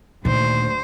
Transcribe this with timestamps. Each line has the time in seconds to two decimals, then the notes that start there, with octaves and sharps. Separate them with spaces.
0.25 D2 A#2 D#3 C5